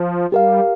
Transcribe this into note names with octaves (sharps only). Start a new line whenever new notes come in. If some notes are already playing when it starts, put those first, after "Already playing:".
Already playing: F3
G3 G4 A#4 F5